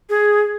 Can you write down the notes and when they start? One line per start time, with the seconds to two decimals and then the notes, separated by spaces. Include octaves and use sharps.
0.09 G#4